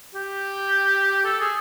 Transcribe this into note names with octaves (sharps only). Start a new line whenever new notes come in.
G4
A4
G#4